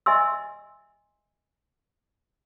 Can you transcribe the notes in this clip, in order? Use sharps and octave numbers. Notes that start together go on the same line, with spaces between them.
D#5 E5 G#5 C6 E6